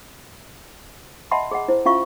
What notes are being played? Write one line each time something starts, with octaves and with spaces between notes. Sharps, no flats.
D#5 E5 F#5 A5 B5 C6
G#4 D#5 F#5
E4 C5
C#4 E4 F4 E5 F5 C#6